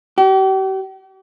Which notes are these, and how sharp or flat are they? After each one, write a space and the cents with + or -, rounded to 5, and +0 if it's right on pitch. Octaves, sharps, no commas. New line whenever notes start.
G4 -40